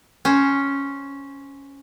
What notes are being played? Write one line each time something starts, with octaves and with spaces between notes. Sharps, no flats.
C#4 C5